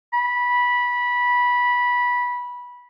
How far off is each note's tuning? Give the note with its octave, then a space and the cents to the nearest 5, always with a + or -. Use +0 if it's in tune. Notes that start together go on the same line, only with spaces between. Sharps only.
B5 -15